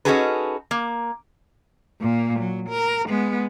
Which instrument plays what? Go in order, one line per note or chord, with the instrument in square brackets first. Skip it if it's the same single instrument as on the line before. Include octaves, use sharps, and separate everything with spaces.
[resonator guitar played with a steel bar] C#4 D#4 F#4 G#4 A4 B4
A#3
[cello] A#2 A#3
F#3
A#4
G#3 B3